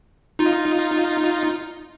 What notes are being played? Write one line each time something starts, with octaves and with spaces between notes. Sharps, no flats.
D#4 F4